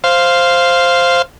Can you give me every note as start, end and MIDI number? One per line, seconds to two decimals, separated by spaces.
0.04 1.22 72
0.04 1.22 77